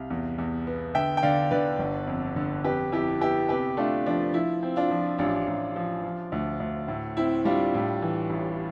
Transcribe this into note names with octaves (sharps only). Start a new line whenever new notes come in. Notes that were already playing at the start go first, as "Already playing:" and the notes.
Already playing: C2 F5
E2
E2
B3
D3 E5 G5
G5
D3 D5 F5
D3 B4 D5
G1
F2
D3
F2 G4 B4
F2 E4 G4
B3 E4 G4
C3 G4 B4
A3 D4 F4
F3 D4
F3 E4
C4
D4 F4
F3
A1 D4 F4
A1
F3
F3
D2
D2
A2
C4 E4
G3 D4 F4
A2
E3
A1